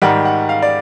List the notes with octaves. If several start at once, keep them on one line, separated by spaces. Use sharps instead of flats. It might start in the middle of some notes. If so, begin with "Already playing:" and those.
G#2 D#3 G3 F#5
F#5
F5
D5